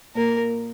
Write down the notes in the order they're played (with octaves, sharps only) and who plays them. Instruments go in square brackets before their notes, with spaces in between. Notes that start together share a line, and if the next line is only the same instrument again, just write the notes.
[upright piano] A#2 [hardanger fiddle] A#4